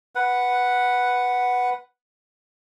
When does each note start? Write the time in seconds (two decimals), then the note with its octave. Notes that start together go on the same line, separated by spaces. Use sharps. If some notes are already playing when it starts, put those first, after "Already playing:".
0.15 B4 F#5